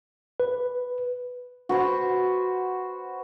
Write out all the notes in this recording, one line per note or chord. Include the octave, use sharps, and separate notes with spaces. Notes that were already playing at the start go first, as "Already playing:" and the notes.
B4
F#4 B4 C5